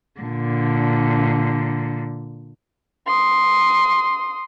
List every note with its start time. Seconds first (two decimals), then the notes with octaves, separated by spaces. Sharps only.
0.21 A#2 D3
3.06 C6 D#6